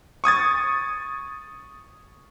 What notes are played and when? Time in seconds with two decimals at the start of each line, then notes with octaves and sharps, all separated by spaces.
0.24 C#6 D#6 G#6 A6